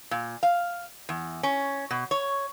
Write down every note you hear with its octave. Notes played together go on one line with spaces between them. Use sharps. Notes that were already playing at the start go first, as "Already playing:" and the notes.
A#2
F5
E2
C#4
B2
C#5